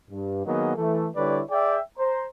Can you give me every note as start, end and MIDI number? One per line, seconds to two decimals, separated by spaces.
0.11 0.45 43
0.46 0.73 51
0.46 0.73 54
0.46 0.73 58
0.46 0.73 59
0.46 0.73 68
0.46 0.73 75
0.77 1.07 52
0.77 1.07 57
1.16 1.41 50
1.16 1.41 55
1.16 1.41 64
1.16 1.41 71
1.16 1.41 73
1.16 1.41 74
1.50 1.79 68
1.50 1.79 74
1.50 1.79 76
1.50 1.79 79
1.98 2.25 72
1.98 2.25 82